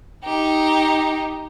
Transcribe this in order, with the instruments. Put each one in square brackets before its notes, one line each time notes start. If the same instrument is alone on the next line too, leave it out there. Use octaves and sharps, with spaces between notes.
[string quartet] D#4 G4